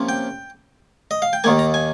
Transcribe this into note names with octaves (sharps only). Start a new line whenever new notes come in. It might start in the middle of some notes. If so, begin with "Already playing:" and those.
Already playing: C3 F3 A#3 C#4
G5
D#5
F5
G5
D#2 D#3 A#3 G#5
A#5
G#5